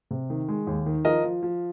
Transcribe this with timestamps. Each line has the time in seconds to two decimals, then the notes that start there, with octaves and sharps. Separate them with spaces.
0.11 C3
0.30 D#3
0.48 G#3
0.67 D#2
0.86 D#3
1.05 F3 A#4 D#5
1.24 F3
1.42 F3